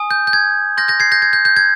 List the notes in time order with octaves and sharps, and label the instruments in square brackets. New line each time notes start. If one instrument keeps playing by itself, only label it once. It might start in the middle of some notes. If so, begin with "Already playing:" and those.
Already playing: [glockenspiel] G#5 D#6
G6
G6
G#6
C6 F6 G6 A#6
G6 A#6
G#6 C7
G6 A#6
G#6
G6
G6
G#6